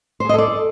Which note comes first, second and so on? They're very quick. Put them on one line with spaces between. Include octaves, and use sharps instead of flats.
C5 G#4 D#5 A4 D5